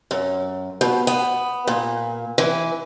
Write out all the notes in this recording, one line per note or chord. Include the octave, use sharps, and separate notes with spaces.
F#2
B2
B3
A#2
E3